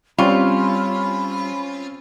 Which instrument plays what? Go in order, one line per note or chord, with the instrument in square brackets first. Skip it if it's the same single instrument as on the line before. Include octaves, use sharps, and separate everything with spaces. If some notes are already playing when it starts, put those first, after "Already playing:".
[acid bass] G3 [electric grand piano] C4 C#4 C#6 [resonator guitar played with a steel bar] F4 [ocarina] B5